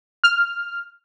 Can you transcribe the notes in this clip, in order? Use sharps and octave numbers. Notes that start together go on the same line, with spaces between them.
F6